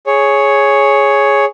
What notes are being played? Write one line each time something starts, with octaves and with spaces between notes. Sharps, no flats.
G#4 C#5